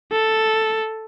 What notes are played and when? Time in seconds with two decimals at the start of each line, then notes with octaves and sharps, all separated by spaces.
0.12 A4